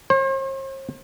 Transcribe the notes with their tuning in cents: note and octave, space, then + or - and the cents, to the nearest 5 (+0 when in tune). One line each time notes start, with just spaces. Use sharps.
C5 +45